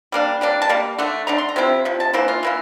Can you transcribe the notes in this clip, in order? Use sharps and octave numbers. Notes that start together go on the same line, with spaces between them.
G3 A#3 D4
G3 A#3 D4
A5
G3 A#3
D3 A3 D4
D3 A3 D4 A#5
C6
A#5
C3 F3 C4 E4
C3 F3
A5
E3 A#3 E4 C5
F4
E3 A#3 E4